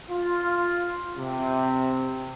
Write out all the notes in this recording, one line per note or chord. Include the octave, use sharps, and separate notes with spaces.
F4
C3